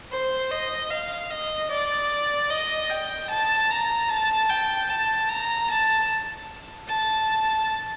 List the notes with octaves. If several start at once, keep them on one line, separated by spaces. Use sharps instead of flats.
C5
D#5
F5
D#5
D5
D#5
G5
A5
A#5
A5
G5
A5
A#5
A5
A5